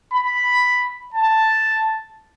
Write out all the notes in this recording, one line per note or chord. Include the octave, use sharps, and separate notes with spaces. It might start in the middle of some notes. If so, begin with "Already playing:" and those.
B5
A5